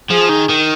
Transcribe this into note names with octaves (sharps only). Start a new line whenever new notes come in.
F3 G#4
D#3
D#3